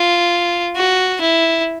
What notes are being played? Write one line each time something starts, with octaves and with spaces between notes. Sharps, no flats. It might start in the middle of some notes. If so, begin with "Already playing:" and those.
Already playing: F4
F#4
E4